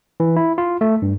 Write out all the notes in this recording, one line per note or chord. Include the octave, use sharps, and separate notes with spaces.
E3
E4
F4
A3
G2